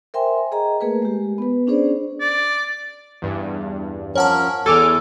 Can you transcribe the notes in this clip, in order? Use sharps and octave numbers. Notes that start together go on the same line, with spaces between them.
A#4 C5 E5 G5 G#5 C6
G#4 D#5 A#5
A3 A#3 G#4 A#4 B4
G#3 G4
B3 B4
C#4 D4 G#4 C5 D5
D5
E2 G2
F3 C#4 A#4 C#5 F#5 A5
E2 A4 G#5 D6 F6